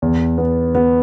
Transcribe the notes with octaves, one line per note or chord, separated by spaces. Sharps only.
E2
B3
B3